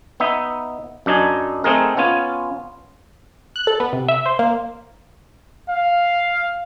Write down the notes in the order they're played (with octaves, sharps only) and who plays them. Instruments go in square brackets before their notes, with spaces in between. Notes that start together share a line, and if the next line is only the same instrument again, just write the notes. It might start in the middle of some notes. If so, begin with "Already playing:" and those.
[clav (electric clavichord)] B3 D#4 E5
F#2 D4 D#4 G#5
A3 C4 D#4 G#4 A#4
B3 C#4 F4 G#5
[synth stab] F#6
A4
B3
C3
E5
C5
A#3
[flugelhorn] F5